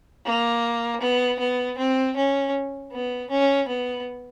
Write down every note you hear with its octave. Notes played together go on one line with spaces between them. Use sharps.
A#3
B3
B3
C4
C#4
B3
C#4
B3